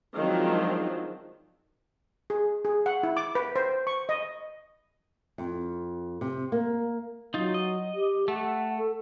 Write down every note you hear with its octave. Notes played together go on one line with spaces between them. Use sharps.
D#3 F3 F#3 G#3 C4 D4
G#4
G#4
F#5
E4
D6
B4
C5
C#6
D#5
F2
C3
A#3
F#3 D#4 F4
D#5
G4
A3 F#5
A4